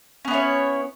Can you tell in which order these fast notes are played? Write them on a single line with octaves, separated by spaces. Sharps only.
C#4 B3 E4 C#5